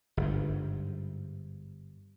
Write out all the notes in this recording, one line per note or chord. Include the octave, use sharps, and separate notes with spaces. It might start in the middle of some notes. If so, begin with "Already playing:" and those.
G1 G#2